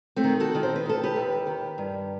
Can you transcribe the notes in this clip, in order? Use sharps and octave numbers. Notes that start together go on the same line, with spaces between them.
A3 C4
D#3
F#4 A4
D#3
C5
B4
D#3 A4
G4 B4
D#2
D#3
G2